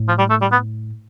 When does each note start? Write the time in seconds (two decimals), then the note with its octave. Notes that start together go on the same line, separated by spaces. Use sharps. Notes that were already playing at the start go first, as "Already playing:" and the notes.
Already playing: A2
0.08 F3
0.19 G3
0.30 A3
0.41 G3
0.52 B3